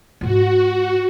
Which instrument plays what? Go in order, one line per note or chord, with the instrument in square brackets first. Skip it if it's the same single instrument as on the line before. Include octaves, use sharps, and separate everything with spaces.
[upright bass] G#2 F4 [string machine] F#4